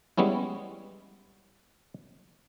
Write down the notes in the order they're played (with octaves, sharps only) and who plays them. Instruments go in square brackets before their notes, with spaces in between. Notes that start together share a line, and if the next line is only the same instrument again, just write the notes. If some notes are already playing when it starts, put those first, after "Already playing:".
[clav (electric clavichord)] G3 G#3 B3 C#4 E4